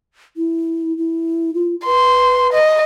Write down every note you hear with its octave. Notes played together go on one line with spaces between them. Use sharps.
E4
E4
F4
B4 C6
D#5